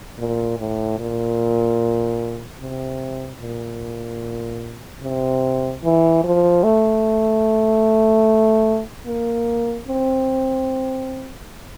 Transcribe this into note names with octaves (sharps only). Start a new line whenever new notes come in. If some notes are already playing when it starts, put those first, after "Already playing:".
A#2
A2
A#2
C3
A#2
C3
E3
F3
A3
A#3
C4